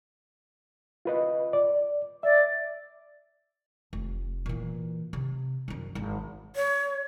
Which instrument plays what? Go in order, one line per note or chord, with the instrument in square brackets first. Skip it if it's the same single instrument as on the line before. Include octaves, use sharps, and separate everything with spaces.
[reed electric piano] F4 B4 D#5
D5
[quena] D5 [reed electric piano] E5
[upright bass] F1
A#2 E3
C3
F#2 F3
G#1
[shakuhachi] C#5